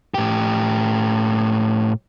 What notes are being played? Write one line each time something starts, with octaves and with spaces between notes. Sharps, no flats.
A2 G4